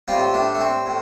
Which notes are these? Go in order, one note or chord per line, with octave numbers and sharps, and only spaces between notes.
A2 G3 C4 F4
A3 D4
A3
C4
A2